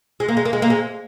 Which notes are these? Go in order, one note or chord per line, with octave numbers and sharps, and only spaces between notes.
G#3
A#3
G#3
A#3
G#3
A#3
G#3